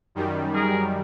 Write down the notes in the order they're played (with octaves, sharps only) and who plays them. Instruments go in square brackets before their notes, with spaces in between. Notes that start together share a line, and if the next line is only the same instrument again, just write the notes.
[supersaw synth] F#2 D#3 G3
[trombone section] G#4 A#4